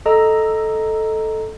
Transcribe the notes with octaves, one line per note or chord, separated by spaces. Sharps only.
A4 D#5 A#5 E6